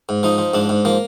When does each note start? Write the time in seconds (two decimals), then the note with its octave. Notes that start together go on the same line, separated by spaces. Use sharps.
0.09 G#2
0.23 F3 D#4
0.38 F3
0.54 G#2 D4
0.69 G#2
0.85 F3 A#3